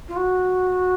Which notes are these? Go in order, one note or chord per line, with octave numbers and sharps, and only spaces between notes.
F4
F#4